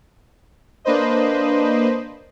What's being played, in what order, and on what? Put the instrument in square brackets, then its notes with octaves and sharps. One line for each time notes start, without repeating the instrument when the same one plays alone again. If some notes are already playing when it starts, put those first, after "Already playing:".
[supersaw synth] A#3 D4 B4 C5 D#5